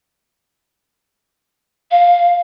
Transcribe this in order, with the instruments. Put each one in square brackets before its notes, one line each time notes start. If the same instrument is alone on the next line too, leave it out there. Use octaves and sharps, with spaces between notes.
[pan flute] F5